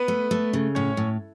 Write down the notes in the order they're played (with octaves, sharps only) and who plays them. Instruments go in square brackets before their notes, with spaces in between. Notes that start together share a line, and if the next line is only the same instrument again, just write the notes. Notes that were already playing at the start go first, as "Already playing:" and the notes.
Already playing: [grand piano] B3 B4
[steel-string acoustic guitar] A3
A3
C#3
[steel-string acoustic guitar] A2 [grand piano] C#4 C#5
[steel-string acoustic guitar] A2